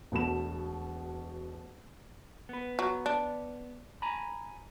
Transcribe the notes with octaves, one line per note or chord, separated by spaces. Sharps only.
E1 B2 A3 B5 E7
B3 B4
F#3
D4
G#5 A#5 B5